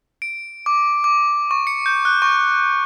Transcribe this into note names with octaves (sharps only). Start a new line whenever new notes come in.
D7
D6
D6
C#6
C#7
G6
F#6
C#6